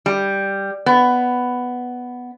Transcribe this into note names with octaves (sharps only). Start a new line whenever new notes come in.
G3
B3